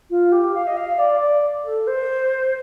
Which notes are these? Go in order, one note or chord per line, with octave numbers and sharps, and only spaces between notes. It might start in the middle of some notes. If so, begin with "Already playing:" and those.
F4
G4
F5
D#5
F5
D5
D5
A4
C5